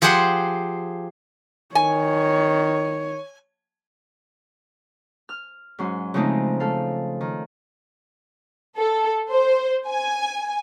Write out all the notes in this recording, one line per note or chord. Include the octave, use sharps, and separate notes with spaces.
F3 G4 G#4 C5 F#5 C6
D#3 C#5 G#5
F6
G#2 F#3 C#4 C6
C#3 F3 G#3 A3 C4 D#4
A3 A4 F5
D#3
A4
C5
G#5